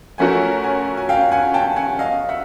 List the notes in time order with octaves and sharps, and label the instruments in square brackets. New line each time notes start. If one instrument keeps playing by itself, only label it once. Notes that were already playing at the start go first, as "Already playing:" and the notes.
[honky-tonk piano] F3 A3 C#4 F#4 A#4 [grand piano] F#5 G#5
[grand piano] F#5 G#5
G#5
F5 G5
F#5 G#5
G5 A5
F#5 G#5
D#5 F5
E5 F#5